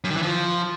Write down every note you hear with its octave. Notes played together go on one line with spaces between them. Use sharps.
F#2
D#3
E3
F3